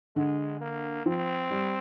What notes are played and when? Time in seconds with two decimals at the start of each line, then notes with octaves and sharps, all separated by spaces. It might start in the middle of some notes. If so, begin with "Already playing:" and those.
0.16 D3 G#3
0.61 A#3
1.06 F3 C4
1.50 G3